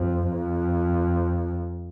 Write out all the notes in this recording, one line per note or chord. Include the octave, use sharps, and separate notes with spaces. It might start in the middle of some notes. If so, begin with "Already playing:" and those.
Already playing: F2
F2